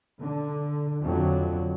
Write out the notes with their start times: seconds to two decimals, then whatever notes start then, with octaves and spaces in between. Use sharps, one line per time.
0.21 D3
1.01 F2 D3 F#3